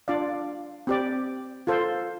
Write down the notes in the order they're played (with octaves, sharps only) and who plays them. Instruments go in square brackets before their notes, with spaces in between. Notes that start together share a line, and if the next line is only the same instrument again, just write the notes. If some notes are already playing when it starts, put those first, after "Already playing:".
[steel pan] D4 F4 D5 F5
C4 G4 D5
F4 A4 C5